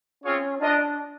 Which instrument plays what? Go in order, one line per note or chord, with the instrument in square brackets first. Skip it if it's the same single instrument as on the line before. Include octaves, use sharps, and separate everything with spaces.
[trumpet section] C4 F4 G#4 C#5 [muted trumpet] C#4
[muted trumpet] D4 [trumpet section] F4 A#4 D#5